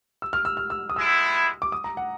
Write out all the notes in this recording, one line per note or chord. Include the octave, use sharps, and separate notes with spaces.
E6
F6
E6
F6
E6
D#6
G#3 B3 E4 E6
D6
D#6
A#5
F#5